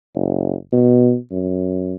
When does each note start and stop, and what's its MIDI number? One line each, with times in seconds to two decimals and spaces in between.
0.15 0.54 30
0.72 1.16 47
1.31 1.95 42